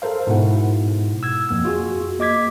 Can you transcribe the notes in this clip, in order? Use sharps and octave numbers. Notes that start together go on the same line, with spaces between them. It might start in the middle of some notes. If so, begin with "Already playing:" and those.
A4 A#4 C5 F5
G#2 B2 E4 F#5
E6 G#6
F2 A#3 E6
F4 F#4 G#4
A#3 D#5 D6 G#6 B6